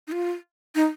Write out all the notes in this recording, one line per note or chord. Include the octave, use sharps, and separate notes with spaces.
D#4
F4
D#4